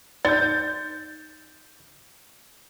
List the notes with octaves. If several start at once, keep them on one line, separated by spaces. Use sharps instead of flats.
D#4 D5 G6 A6